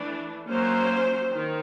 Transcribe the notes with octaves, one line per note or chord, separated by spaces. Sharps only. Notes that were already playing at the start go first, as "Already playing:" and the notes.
Already playing: E3 A3 D4
F#3 A#3 C#4 C5
D#3